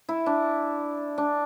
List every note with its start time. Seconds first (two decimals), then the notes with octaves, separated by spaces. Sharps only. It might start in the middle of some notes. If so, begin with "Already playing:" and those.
0.09 E4
0.26 D4
1.18 D4